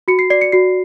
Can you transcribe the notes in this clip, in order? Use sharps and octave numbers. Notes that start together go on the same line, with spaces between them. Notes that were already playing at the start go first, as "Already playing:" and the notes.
F#4 C#7
C7
D5 C7
C#7
F#4 C7